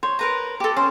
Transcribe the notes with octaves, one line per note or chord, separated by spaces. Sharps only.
C5 C#5
A#4 B4 A#5
G4 A4
C#4 C5